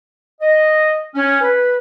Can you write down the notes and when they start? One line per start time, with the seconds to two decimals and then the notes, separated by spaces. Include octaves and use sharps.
0.41 D#5
1.15 C#4
1.41 B4